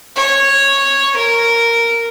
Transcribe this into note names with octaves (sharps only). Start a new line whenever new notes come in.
C#5
A#4